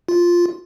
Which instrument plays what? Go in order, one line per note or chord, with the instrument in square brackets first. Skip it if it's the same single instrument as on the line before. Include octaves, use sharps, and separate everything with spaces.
[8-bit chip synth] F4